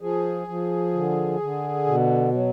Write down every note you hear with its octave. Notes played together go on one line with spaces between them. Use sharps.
F3 G#4
F3
D3
D3
B2
F#3